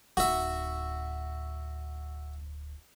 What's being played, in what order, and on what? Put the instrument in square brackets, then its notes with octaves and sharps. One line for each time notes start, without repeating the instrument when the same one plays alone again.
[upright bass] D1 D#4 [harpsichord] F#4 E5